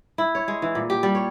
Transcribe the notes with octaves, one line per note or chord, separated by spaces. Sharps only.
E4
C#5
G#3
E3
A#2
G4
G3
C#5